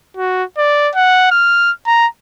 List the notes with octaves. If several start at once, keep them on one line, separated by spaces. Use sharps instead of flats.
F#4
D5
F#5
F6
A#5